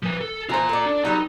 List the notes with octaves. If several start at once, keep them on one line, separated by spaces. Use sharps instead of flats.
F3 B4
A4
E3 F4 C5 A#5
A4 D5
D4
F#3 G3 B3 D#4